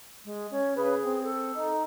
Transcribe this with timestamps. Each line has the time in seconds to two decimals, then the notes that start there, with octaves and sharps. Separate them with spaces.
0.25 G#3
0.51 C#4
0.77 C#3 G#4 B4
1.04 C4
1.23 A4
1.55 D#4